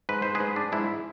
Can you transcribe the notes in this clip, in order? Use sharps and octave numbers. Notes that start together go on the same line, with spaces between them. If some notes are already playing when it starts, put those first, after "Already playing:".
G#2 B4
G#2 C5
G#4 B4
G#2
D4
G#2 E4